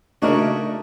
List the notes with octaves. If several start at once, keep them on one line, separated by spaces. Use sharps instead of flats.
C#3 A3 D4 D#4 F#4 A#4 C#5 E5